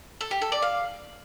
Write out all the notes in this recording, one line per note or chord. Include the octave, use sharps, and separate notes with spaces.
A4
G4
A4
D5
F5